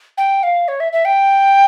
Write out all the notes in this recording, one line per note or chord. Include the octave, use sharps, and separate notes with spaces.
G5
F5
C#5
E5
E5
G5